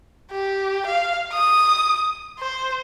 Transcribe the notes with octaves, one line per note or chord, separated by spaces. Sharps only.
G4
F5
D#6
C5